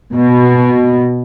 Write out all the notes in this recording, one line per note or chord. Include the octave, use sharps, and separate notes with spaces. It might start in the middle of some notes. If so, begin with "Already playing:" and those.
B2